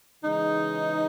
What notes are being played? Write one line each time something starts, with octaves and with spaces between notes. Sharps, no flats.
C#3 E3 G#3 D#4